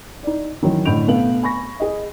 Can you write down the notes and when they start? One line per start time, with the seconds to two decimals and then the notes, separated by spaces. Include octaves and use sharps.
0.23 D#4 D5
0.62 D#3 E3 F#3
0.85 A2 D3 D#5 G6 D7 F7
1.07 B2 A3 B3 F5 F#7
1.43 G#5 B5 C#6 A#6
1.80 G#4 D#5